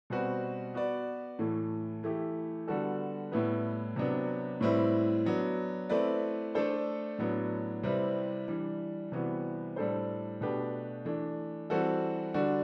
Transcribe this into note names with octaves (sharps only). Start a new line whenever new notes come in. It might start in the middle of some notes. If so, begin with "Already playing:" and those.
B2 G3 C4 F#4 B4
B3 F#4 B4 D5
A2 E3 A3
E3 A3 E4 G4
D3 G3 B3 F#4 A4
A2 G3 B3 E4 B4
C3 F#3 B3 D4
A2 G3 C4 E4 B4
F#3 B3 D4
A3 C4 E4 B4 D5
A3 D4 A4 C5
A2 F#3 B3 D4
C3 G3 C4 E4 B4
E3 G3 D4
C3 E3 G3 B3 F#4
A2 G3 D4 A4 C5
B2 A3 D4 G4 B4
E3 A3 D4
E3 G3 C4 F#4 A4
D3 G3 D4 F#4